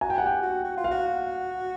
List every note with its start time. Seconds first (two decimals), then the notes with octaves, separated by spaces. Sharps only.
0.01 F#4 G#5
0.10 G5
0.18 F#5
0.22 G4 G5
0.42 F#4
0.64 F#4
0.77 F4
0.84 F5
0.91 F#4